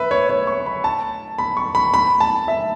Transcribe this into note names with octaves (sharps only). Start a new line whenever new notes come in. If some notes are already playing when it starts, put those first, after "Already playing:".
Already playing: B4 E5
C#5
C#5
C#6
B5
A5
B5
C#6
B5
B5
A5
E5